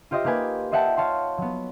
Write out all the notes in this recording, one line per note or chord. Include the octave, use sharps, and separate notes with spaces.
F4 G4 C5 D#5 E5
A#3 D#4 G4 B4 G#5
C5 D#5 E5 F#5 G5 A5
C#5 F5 A5 C6
F#3 B3